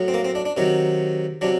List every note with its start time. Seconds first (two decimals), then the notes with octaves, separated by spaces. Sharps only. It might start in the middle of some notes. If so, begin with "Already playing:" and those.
Already playing: A2 F#3
0.08 C4
0.14 A#3
0.25 C4
0.35 D4
0.45 D4
0.57 C3 D#3 F#3
1.41 C3 F#3 D4